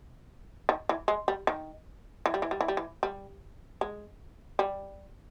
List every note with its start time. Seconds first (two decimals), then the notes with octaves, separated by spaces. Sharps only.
0.69 D#3
0.89 E3
1.08 G#3
1.28 G3
1.47 D#3
2.26 E3
2.34 G3
2.42 E3
2.51 G3
2.61 E3
2.68 G3
2.77 E3
3.03 G3
3.81 G#3
4.59 G3